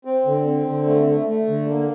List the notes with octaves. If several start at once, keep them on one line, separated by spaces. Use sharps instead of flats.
C4
D3
C4
D3
A3
A3
A3
D3
A#3